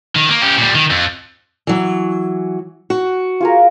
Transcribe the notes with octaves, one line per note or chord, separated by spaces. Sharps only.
D#3
A#3
C#4 G4
A#2 G3
D#3
F2
E3 F#3
F#4
F4 G#4 A#4